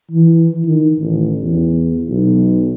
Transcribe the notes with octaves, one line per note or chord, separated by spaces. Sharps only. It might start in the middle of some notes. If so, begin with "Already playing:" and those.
E3
D#3
A1
E2
B1